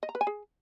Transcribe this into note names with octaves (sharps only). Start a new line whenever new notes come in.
D#5
A#5
B4
G#5
G#4